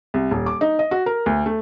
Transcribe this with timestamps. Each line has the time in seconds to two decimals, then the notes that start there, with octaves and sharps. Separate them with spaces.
0.14 C2
0.31 D#1
0.46 D6
0.61 D#4
0.79 D#5
0.91 F#4
1.06 A#4
1.26 D2
1.46 A3